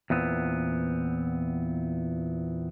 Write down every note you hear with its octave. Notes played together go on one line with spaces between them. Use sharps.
E2 A#2 B3 C4